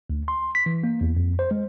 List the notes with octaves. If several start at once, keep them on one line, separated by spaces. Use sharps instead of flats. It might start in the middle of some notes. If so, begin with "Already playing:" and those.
D2
C6
B6
E3
A#3
E2
F2
C5
G#3